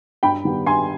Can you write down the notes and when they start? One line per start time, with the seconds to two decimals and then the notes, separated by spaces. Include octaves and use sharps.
0.23 G2 G5 B5
0.44 D#3 G3 B3
0.66 G2 G#5 C6